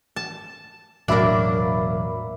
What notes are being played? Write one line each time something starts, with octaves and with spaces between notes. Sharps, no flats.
A5
E1 A2 F#3 A#3 D4 E5 B5